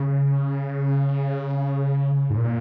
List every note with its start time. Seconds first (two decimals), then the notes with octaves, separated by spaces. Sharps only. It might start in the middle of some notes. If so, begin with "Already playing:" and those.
Already playing: C#3
2.30 G#2
2.37 A#2